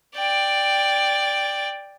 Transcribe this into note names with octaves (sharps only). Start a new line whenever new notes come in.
D5 G5